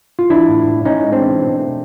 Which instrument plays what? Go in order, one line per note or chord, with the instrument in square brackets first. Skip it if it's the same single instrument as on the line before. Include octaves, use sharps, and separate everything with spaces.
[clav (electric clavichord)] F4
E3 D4 E4
A2
A2
A2 C#4 D#4
G#3
C4 D4
E3
B2
A3